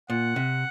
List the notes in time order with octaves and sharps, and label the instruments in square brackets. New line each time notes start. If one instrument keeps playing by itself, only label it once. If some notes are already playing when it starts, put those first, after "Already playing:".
[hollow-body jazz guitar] A#2 [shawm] F#5
[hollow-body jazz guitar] C3